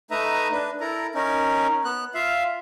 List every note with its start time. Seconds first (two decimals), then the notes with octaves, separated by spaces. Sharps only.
0.11 A3 D#4 B4 D#5 E5 A#5
0.52 D4 B4
0.81 E4 A4 A#4 A#5
1.15 C#4 D#4 A#4
1.85 B3 F#6
2.14 F4 E5 F5